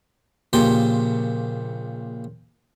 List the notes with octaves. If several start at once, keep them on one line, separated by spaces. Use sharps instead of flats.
A#1 A#2 C#3 G4 C6